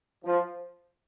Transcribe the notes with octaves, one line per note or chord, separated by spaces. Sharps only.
F3